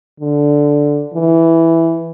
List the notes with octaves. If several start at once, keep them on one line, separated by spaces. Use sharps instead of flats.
D3
E3